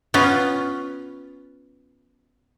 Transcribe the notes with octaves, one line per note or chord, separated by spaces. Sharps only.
B3 C#4 F4